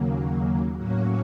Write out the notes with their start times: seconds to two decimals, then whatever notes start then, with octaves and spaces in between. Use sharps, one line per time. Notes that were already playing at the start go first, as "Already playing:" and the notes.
Already playing: D#2 C#3 F#3 A#3
0.77 A2 F#3 A#3 C#4 F#4